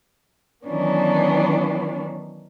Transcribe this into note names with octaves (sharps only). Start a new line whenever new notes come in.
D#3 E3 F#3 B3 C#4 D4